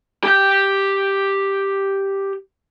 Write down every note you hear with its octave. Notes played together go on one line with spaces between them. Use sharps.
G4 G5